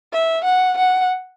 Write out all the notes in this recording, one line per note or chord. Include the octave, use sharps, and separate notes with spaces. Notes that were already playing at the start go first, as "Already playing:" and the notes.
E5
F#5
F#5